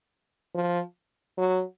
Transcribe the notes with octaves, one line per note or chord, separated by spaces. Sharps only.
F3
F#3